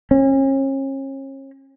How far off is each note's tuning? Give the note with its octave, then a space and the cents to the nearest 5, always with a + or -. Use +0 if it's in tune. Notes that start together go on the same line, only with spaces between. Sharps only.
C#4 -40